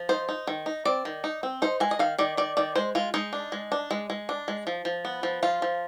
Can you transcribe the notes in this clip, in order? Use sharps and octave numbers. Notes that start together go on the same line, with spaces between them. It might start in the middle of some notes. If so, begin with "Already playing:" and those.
Already playing: F3
D#4 C5
D#4
D#3
D#4
C4 D5
D#3
D#4
C4
D#4 C5
G#3 G#5
D#5
D#3 F5
D#3 D5
D#3 D5
D#3 D5
G#3 C5
G#3 F4
G#3 D#4
D4
G#3
D4
G#3
G#3
D4
G#3
F3
F3
B3
F3
F3 F4
F3